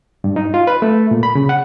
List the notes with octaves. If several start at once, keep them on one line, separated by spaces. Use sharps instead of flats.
G2
D#4
F4
B4
A3
A#2
B5
C#3
F#5